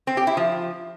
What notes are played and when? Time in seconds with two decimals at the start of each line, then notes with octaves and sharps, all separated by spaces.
0.07 C4
0.17 G4
0.27 E4
0.37 F3